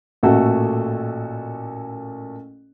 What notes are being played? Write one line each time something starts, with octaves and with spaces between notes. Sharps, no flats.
A1 A#2 A3 F#4 A4